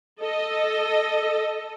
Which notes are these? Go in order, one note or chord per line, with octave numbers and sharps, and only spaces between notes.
A4 D#5